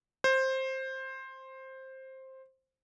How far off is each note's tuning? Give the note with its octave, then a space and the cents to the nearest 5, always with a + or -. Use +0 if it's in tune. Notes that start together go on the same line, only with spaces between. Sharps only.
C5 +10